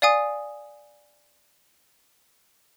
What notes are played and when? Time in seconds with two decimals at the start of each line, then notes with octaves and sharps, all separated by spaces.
0.02 D5 F5 G#5 D#6